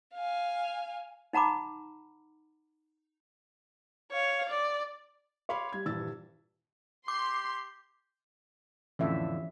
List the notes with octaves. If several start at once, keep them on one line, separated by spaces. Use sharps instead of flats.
F5 G#5
D#4 F#5 A#5 B5 D6
C#5 F5
D5
C#5 F5 B5 C6 D6
G3 G#6
D#1 G2 E3 E6 A6
G4 C6 D6
F2 A2 D3 E3 C#4 E5